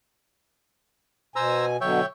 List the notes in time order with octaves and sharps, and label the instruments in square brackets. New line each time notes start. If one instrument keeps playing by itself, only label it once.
[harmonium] B2 G#5 [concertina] C5 A#5 E6
[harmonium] B2 D3 F#3 [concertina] C#5 E5 G5